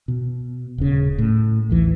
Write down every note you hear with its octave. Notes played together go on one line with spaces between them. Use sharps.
B2
D#1 C#3
A2
A1 D#2 E3